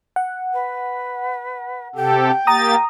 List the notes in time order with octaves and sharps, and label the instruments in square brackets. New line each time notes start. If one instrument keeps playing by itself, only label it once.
[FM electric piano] F#5
[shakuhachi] B4
[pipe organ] C3 G4 A4 [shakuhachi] G5
[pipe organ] A#3 G4 A6 [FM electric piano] A#5 D#6